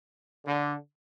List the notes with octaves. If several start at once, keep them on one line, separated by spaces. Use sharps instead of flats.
D3